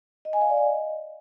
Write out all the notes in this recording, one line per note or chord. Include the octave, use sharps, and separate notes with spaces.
D#5
G#5
F5
D5
D#5